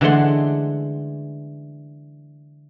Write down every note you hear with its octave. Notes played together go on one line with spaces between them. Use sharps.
D3 E3 G#3 A3 F#5 C6